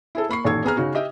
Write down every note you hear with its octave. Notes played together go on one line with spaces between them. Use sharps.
E4 G#4 A4
A#3 B5 C#6 C7
A1 A#2 D#3 A4 C#6 G#6
B3 G#4 A#5 F6
C#3 D#4 F#4
G4 D#5 E5 G5